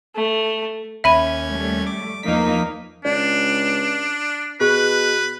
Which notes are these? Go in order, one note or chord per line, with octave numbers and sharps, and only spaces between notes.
A3
D#2 C#4 E5 B5 G#6 D#7
G3 A3
D6
E2 F3 A#3 D#4 B6
C#2 D4 D5
B2 G#4 B4 F#6